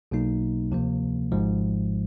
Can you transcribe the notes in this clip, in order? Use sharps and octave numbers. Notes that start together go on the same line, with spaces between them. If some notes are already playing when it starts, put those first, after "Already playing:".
B1 B2 F#3 A#3 D#4
D2 C3 F3 A#3
G#1 G#2 F3 G#3